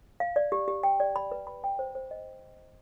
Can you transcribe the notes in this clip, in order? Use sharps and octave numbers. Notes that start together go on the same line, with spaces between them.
F5
D5
G4
G4
G5
D5
B5
B4
B5
G5
C5
C5
D#5